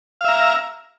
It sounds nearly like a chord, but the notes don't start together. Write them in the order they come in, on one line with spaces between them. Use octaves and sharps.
F5 E5 A#5